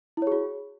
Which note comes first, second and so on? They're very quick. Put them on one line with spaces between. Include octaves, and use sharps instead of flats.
E4 C#5 G#4 F#4